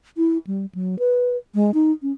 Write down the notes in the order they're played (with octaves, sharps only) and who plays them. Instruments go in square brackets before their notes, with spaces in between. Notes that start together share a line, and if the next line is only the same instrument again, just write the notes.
[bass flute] E4
G3
F#3
B4
G#3
D#4
C#4